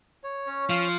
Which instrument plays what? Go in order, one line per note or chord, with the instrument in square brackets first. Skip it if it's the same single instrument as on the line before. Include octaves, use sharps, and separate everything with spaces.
[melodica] C#5
C#4
[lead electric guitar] F3 [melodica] F5